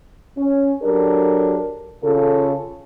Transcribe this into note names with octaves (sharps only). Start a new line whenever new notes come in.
C#4
F#3 D4 G4 A4 A#4
C#3 F4 A4